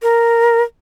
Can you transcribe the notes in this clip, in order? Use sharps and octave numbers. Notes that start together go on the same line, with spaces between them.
A#4